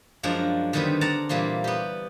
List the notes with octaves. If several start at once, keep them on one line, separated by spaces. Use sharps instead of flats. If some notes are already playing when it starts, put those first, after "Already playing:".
F#2 F3 G#3 D4 A#5
D3 D#3 G3 B3 C4
D5 F#5 A5 A#5
A#2 E3 G3 A#3 C4
B3 G4